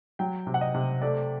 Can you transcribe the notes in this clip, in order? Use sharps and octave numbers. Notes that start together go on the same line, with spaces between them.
F#3 G5
C3
F#5
D#5
C3
A3 D5